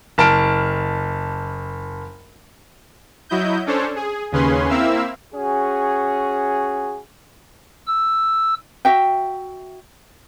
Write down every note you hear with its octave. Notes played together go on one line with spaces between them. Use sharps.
F#1 A5 F6 D7
F#3 E4 D#5 G6
C#4 D4 A4 C5 C#5
G#4
D#2 C#3 C#4 G#4 B4 C6
A#3 C4 E4 E5 F5 E6
C#4 F#4 G#4
E6
F#4 E5 G5